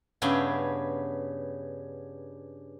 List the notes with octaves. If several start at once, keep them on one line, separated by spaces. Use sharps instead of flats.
G2 C#3 B3 C#4 E5 G5